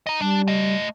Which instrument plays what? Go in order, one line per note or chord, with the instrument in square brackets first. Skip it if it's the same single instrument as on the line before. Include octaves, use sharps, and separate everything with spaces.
[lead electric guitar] D#5 A#5
[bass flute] G3 [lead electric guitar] D4
[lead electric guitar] A3 D#5